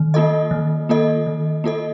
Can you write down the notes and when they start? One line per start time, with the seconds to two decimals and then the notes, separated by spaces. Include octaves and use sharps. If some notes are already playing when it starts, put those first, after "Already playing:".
Already playing: D#3
0.14 A#3 F4 A4 D#5
0.51 D#3
0.89 A#3 F4 A4 D#5
1.26 D#3
1.64 A#3 F4 A4 D#5